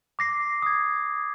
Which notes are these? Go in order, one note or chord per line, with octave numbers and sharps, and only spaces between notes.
D6 A#6 C7
D#6 G#6